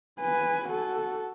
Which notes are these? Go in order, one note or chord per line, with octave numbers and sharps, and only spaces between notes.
B4 G#5
F#4 A4